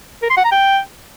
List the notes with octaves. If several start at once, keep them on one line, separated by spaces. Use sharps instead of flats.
A#4
C6
F#5
A#5
G5